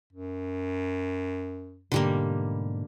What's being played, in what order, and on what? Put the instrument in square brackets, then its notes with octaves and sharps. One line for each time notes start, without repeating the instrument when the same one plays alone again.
[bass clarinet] F#2
[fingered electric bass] G#2 B2 [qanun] D3 G3 A#3